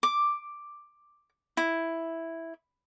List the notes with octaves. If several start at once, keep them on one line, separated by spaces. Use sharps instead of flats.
D6
E4